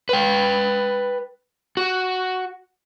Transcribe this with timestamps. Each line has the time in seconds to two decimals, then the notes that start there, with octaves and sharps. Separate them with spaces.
0.09 B4 G5
1.77 F#4